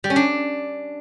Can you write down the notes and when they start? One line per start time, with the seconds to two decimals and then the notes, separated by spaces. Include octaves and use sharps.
0.04 G3
0.10 C#4
0.16 D4